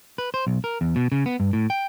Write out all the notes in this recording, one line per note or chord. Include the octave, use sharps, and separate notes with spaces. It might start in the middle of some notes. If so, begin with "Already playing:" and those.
B4
C5
B1
A#4
E2
B2
C#3
B3
G2
A2
G5